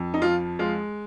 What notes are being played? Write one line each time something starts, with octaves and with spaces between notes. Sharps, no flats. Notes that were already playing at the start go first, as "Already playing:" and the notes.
Already playing: F2
D#4
F3 F4
G#3 F4